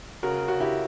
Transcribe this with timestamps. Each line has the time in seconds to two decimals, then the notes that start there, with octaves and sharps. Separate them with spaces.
0.23 C#3 F#4 A#4
0.48 C#3 F#4
0.60 E4 G4